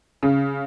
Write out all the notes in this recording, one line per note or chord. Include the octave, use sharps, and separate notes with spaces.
C#3